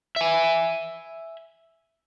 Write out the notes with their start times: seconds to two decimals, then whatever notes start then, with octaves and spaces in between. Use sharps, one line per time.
0.16 E5 G#5